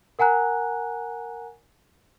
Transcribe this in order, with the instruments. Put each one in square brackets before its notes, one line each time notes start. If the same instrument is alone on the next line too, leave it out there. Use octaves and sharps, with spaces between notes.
[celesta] A#4 F#5 G#5 A#5 F#6